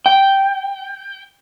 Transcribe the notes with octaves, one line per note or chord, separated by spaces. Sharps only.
G5